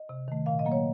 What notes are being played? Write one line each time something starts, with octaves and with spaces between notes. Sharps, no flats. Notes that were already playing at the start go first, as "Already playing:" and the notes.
Already playing: D#5
C3
D#3 A3
A#2 F5
D#5
F#3 A#3
C#5